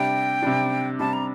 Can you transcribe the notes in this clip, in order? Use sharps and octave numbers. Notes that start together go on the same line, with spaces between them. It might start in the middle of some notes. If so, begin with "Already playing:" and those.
Already playing: C3 G3 D4 G5
C3 G3 D4
C3 G3 D4 A5
A#5